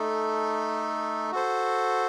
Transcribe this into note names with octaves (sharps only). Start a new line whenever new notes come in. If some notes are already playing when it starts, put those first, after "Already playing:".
Already playing: A3 D#4 A4
F#4 A4 C5